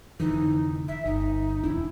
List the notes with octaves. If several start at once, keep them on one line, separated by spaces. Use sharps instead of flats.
F1 D3 E3 D#4
E5
G1 D#4
E1 E2 D4 E4